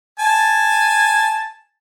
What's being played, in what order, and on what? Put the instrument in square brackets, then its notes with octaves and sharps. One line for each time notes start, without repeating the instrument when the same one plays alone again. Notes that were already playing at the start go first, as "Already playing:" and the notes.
[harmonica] G#5 A5